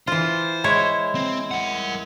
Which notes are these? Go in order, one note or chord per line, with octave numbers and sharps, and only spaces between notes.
E3 F4 C5
G#3 E4 C#5
C4
A#4 F#5